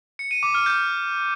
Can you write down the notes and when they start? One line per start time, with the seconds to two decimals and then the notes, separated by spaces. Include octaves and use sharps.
0.19 C#7
0.31 D#7
0.43 D6
0.54 F6
0.66 G6